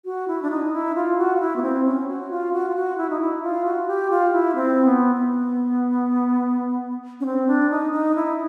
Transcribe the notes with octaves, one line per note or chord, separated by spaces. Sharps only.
F#4
E4
D4
D#4
E4
F4
F#4
F4
E4
B3
C4
C#4
F#4
F4
F#4
F4
F#4
E4
D#4
E4
F4
F#4
G4
F4
E4
C4
B3
B3
C#4
C4
D4
D#4
D#4
E4